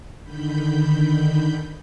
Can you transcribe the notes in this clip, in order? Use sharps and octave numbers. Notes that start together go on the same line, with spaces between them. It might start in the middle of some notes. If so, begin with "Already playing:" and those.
D3 D#3 B5 G6